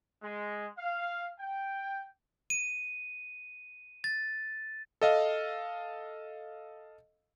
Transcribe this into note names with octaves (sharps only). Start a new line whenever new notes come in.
G#3
F5
G5
D#7
A6
A4 D#5 F5